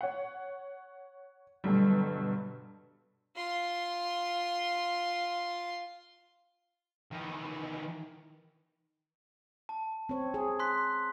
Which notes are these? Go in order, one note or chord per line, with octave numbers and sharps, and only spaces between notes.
C#5 F#5
G2 B2 D3 F#3 G3
F4 C6
D#3 E3
A5
C4 C#5
G#4
C6 F#6 B6